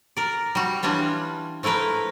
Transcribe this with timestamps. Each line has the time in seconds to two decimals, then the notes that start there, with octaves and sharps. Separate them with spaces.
0.17 A#4 D5
0.55 G3 F#4
0.83 E3 G3 C#4 D4 F4
1.63 F3 A3 E4 A#4 B4